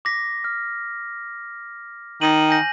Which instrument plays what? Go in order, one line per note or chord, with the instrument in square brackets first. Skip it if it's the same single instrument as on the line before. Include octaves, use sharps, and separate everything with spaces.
[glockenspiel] D6 A#6 B6
F6
[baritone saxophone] D#3 [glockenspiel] D#7 F#7
[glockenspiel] G#5 G6 A#6